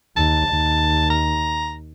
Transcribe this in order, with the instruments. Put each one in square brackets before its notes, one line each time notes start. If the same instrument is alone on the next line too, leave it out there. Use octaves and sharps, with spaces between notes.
[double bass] D#2 [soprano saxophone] A5
[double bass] D#2
[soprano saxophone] A#5